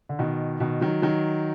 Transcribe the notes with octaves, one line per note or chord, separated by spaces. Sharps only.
D3
B2 D#3
B2 D#3
D#3 F#3
D#3 F#3